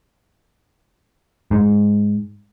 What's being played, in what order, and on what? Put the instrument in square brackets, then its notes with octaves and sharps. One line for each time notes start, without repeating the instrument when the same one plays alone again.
[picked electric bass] G#2